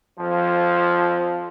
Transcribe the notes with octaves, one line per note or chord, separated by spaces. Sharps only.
F2 F3